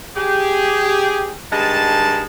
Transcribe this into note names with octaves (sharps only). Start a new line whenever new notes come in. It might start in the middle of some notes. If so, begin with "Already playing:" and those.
G4 G#4
G2 D#3 G#3 A5